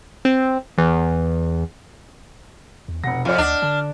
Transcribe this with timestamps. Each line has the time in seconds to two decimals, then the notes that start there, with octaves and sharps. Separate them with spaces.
0.25 C4
0.78 E2
2.88 E2
3.04 F1 B2 F#5 A#6
3.25 F2 F4 D5 F6
3.38 D2 D4 D#5 F#5
3.62 D3 A5